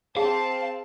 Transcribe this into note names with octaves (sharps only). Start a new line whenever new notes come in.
C4 G#4 F5 A5